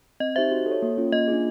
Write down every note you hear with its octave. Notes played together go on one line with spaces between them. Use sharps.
C4 D#5
D#4 G4 C5 E5
F#4
A4
C#5
A#3
C#4 F4
A#3 D#5
D4 F4 G#4